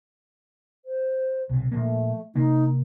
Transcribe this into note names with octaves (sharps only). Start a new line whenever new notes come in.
C5
B1 C3
A#2 F3 A3 A#3
C3 A#3 D#4